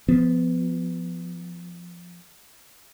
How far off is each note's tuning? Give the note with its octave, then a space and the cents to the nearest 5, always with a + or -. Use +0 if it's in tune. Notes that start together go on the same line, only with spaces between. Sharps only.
F3 +0 B3 +15